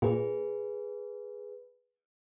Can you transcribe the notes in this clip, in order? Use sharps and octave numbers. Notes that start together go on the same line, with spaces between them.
A#2 G#4 B4